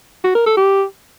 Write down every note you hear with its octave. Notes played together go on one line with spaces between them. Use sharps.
F#4
A#4
A4
G4